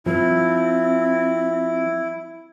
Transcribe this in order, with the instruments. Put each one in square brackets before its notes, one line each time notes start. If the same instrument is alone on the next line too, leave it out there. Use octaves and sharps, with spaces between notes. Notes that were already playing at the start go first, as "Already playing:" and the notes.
[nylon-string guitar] F3 [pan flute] C4 [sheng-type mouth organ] E4